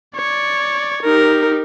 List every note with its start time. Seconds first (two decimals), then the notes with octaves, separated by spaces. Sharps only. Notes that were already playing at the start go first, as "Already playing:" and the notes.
0.16 C#5 D5
1.03 D#4 G4 A#4